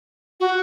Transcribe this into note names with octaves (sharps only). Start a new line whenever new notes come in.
F#4